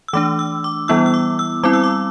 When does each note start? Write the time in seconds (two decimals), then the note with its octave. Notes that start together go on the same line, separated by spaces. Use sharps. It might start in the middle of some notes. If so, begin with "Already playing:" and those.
0.08 E6
0.13 E3 A3 D4 D6
0.39 E6
0.64 D6
0.88 E3 G3 B3 E4 E6
1.06 E6
1.14 D6
1.39 E6
1.63 G3 C4 E4 D6
1.73 E6
1.84 D6